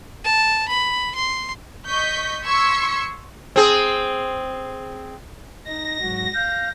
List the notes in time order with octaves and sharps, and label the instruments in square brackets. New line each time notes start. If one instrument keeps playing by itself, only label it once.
[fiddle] A5
B5
C6
[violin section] D#5 C#6 G6 B6
C6 C#6 E6 G#6 B6 C#7
[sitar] C4 G#4
[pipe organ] D#4 [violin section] A#6
[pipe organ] G#2 F#3 F#4
[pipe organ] F5 [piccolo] G6